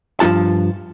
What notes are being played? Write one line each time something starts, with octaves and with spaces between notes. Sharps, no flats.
G2 F3 G#3 F#4 A5